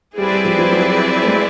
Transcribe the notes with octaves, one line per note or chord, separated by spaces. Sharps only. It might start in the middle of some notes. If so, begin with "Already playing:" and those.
G3 C4 E4 G#4 B4 D5
G3
F3
F3
F#3
A3
G#3